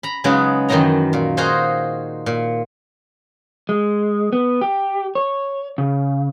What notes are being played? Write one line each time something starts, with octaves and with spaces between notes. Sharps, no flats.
A#5 B5
C#3 F#3 G#3 B3 D#4
F#2 D#3 E3 F#3 D#5 A#5
A#2
D#4 F#4 G#4 C5 D#5 F5
A#2
G#3
B3
G4
C#5
C#3